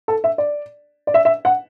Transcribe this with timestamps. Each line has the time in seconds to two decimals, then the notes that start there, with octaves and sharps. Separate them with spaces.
0.08 A4
0.24 E5
0.38 D5
1.07 D5
1.14 E5
1.25 E5
1.45 F#5